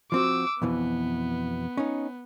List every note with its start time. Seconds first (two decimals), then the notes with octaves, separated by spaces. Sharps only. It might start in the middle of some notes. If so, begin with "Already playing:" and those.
0.12 F3 C4 F#4 D6 E6
0.62 F2 B2 E3 B3
1.77 C#4 D#4